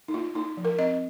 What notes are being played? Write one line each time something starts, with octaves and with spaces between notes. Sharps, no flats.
D#4
A#3 F4
A#3 D#4
F3
A#4
C4 D#5